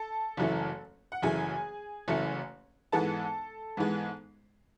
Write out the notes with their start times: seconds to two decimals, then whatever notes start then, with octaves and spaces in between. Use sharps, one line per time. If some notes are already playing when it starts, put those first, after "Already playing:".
Already playing: A4 A5
0.37 F#1 F#2 E3 A3
1.12 F#5
1.22 F#1 F#2 E3 A3 G#4 G#5
2.08 F#1 F#2 E3 A3
2.92 G#2 E3 G#3 B3 A4 A5
3.77 G#2 E3 G#3 B3